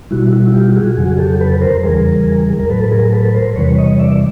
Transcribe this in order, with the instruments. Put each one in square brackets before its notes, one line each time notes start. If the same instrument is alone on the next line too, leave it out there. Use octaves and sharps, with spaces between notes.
[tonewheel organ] B2 G3 E4 F#4
E4 F#4
F4 G4
F#4 G#4
F2 C#3 F#3 F#4 G#4
G4 A4
A4 B4
A#4 C5
E2 C#3 E3 G3 G#4 A#4
A#4
A2 F#3 A4 B4
G#4 A#4
A4 B4
A#4 C5
E2 C3 E3 G3 B4 C#5
C#5 D#5
D5 E5